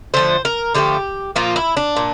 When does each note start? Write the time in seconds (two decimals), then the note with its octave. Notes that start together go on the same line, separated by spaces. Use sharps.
0.14 D3 F3 A3 C5
0.45 A#4
0.74 D3 F3 A3 G4
1.36 A#2 F3 A#3 F4
1.56 E4
1.77 D4
1.96 A#2